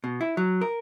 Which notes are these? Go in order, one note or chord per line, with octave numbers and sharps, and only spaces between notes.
B2
E4
F#3
A#4